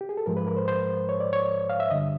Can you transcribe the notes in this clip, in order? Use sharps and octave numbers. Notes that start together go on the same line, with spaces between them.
G4
G#4
A4
G#2 F3 G#3 A#4
B4
A#4
C5
C5
C#5
D5
C#5
F5
E5
G2 D3 G3 D#5